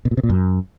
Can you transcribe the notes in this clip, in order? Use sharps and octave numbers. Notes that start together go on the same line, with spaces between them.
B2
A#2
C3
A#2
F#2